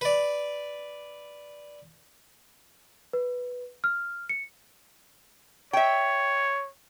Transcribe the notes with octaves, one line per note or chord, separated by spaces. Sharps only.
B4 D5
B4
F6
C#7
C#5 E5 G5